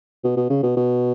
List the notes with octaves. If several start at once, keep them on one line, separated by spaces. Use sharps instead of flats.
B2
B2
C#3
B2
B2